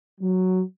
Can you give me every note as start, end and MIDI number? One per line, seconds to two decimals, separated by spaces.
0.21 0.62 54